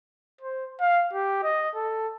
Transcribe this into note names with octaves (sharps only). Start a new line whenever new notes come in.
C5
F5
G4
D#5
A4